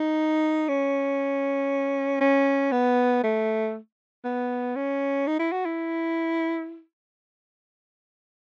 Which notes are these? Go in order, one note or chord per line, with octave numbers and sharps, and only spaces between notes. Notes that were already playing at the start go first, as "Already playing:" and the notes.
Already playing: D#4
C#4
C#4
B3
A3
B3
C#4
D#4
E4
F#4
E4